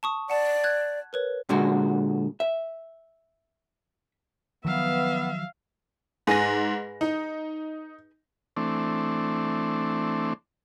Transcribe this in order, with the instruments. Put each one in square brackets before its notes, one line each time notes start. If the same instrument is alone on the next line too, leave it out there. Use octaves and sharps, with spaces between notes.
[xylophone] A5 C#6 D#6
[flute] D5 [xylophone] F#5 A5
[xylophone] F#6 G#6
A#4 B4 C#5
[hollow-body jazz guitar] A#2 D3 G#3 F#4
E5
[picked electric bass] D#3 F3 F#3 [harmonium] B3 [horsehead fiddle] E5 F5
[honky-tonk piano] G#2 A#6 [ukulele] G#4 B4 G#5
[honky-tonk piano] D#4
[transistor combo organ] E3 A3 C4 D4